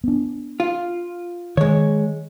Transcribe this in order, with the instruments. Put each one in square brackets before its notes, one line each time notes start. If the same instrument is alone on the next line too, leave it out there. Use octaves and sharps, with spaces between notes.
[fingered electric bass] B3 D4
[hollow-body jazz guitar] F4
[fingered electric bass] D#3 [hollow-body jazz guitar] G#3 C#5